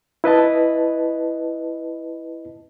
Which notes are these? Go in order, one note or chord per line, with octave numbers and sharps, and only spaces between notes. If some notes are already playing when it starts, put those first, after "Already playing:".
E4 B4 D#5 A5